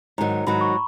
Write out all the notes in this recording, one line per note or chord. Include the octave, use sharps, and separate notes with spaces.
G#2 D#3 F#3 A#5
G#2 D#3 F#3 B5
C#6